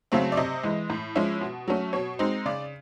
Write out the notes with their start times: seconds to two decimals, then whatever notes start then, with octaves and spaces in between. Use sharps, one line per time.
0.12 C#3 F#3 A3 C4
0.32 D5
0.37 C3 D#5
0.63 E3 G#3
0.90 A2
1.15 F3 G#3 C#4 E4
1.41 B2
1.68 F#3 A3 C#4
1.93 B2 C#5
2.19 G#3 C4 D#4
2.46 C#3 D5